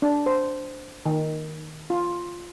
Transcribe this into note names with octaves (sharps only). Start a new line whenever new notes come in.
D4
C5
D#3
F4